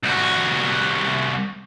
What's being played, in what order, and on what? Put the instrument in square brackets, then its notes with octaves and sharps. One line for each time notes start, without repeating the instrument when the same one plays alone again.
[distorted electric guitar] C2 F#4